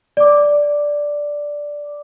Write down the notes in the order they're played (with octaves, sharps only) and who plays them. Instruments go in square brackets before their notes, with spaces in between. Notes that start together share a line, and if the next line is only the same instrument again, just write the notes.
[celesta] D5 D6